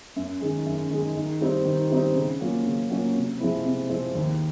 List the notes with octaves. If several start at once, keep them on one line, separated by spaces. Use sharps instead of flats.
F#2
D#3 G#3
F#2
D#3 G#3
D#3
G3 C4 D#4
D#3
G3 C4 D#4
C#3
F#3 A#3 C#4 F4
C#3
F#3 A#3 C#4 F4
C3
F3 G#3 C4 E4
C3
F3 G#3 C4 E4
D#2